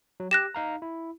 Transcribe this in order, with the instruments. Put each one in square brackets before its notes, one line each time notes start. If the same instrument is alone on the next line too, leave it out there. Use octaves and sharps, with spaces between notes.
[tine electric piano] F#3
[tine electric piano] G4 [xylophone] F#6 A#6 E7
[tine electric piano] D#4 F5 A#5
E4